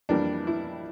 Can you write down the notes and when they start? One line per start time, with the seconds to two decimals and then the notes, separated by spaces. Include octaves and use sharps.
0.09 F2 E3 G3 A#3 D4
0.47 E4